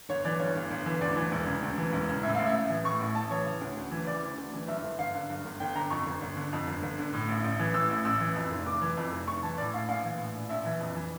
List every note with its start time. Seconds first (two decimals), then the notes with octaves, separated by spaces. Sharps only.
0.09 G1 C#5
0.24 E3 D5
0.39 G2 C#5
0.55 G1
0.71 G1
0.86 E3
1.01 D2 D5
1.16 E3
1.32 E1
1.47 C#3
1.62 D2
1.78 E3
1.93 E1
2.09 C#3
2.23 A2 E5
2.35 A1 F5
2.46 E5
2.54 A1
2.69 E3
2.84 A2 C#6
3.00 A1
3.15 A1 A5
3.30 E3 C#5
3.46 C#3
3.61 D2
3.77 D2
3.91 E3
4.07 C#3 D5
4.23 D2
4.38 D2
4.53 E3
4.68 G2 E5
4.83 G1
4.99 G1 F5
5.14 D3
5.30 G2
5.45 G1
5.60 G1 G5
5.75 D3 A#5
5.90 F2 C#6
6.06 G1
6.21 G1
6.37 D3
6.53 F2
6.67 G1
6.83 G1
6.98 D3
7.13 A2
7.28 A1
7.44 A1
7.59 E3
7.74 A2 E6
7.89 A1
8.05 A1 E6
8.20 E3
8.36 F2
8.51 F1
8.66 F1 D6
8.81 E3
8.97 F2
9.12 F1
9.27 F1 C#6
9.43 E3 A5
9.58 A2 D5
9.73 A#1 F5
9.88 A#1 F5
10.04 E3
10.19 A2
10.35 A#1
10.49 A#1 E5
10.65 E3
10.80 F2
10.95 E3